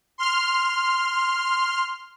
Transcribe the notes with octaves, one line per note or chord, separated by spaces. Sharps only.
C6 F6